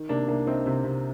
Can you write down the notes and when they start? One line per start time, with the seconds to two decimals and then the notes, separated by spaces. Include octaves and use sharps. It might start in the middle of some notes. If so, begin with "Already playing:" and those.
Already playing: D#3
0.09 C3 A#3 D4
0.28 C2 A#3 D4
0.46 C2 C4 D#4
0.66 C3 C4
0.84 C3